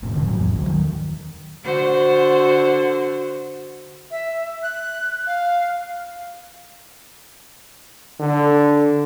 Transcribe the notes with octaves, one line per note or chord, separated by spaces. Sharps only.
F1 A2 C3
D3 E3 G3 A3
G#2 F#3
E2 G#2
D2 F#3
D#3
D3 F#4 C5
E5
F#6
F5
D3